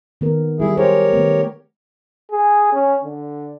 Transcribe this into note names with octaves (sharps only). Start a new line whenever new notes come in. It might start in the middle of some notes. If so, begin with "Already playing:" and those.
D#3 B3 A#4
F#3 G3 E4 G#4
G4 G#4 A#4 C5 C#5
D#3 A3 B3
G#4
C#4
D3